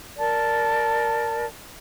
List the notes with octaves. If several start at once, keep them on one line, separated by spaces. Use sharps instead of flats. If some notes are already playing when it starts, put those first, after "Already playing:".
A#4 D5 A5